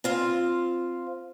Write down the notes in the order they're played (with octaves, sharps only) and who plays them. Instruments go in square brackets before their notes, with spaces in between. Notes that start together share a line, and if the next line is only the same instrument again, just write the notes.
[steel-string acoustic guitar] C4 F4 F5